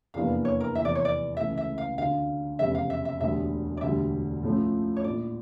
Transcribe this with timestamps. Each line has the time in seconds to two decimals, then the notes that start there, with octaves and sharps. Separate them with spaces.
0.14 F1 E2 E3 A#3 D4 F5
0.45 C#5
0.60 A#4
0.75 F1 E2 E3 E5
0.85 D5
0.95 C#5
1.05 D5
1.37 C#2 C#3 E3 A3 E5
1.58 E5
1.78 F5
1.98 D2 D3 A3 F5
2.59 F1 E2 C#3 G3 E5
2.75 F5
2.90 E5
3.05 E5
3.20 E1 D2 D3 G3 E5
3.77 D5
3.81 E1 D2 D3 G3 E5
4.43 A2 F3 A3 C#4 F4
4.97 C#5
5.04 A#1 A2 F3 D5